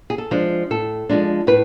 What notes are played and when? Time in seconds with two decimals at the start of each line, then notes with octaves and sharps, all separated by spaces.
0.10 G#4
0.18 A4
0.31 F3 G#3 D4
0.71 A2 A4
1.09 F3 G#3 D4
1.47 A2 B4